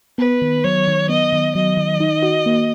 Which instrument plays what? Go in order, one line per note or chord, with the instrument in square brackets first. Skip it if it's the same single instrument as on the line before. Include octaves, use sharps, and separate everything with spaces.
[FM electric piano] B3 [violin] B4
[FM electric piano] D#3
[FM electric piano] F#3 [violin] C#5
[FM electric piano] D#3
[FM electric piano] B3 [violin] D#5
[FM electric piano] D#3
[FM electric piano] F#3 [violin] D#5
[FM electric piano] D#3
D#4
F#4
A#3